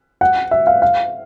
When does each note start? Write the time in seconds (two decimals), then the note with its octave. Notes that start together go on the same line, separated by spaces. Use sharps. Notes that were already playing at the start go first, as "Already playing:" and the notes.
0.21 F#5
0.51 E5
0.67 F5
0.82 F5